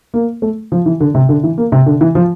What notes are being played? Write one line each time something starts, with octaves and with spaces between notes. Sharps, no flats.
A#3
A3
F3
E3
D3
C3
D3
E3
A#3
C3
D3
E3
F3